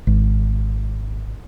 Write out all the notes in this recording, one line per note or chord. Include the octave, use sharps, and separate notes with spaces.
G#1